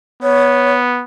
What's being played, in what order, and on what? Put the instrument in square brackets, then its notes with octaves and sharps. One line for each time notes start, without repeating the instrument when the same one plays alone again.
[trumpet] B3 [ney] C#5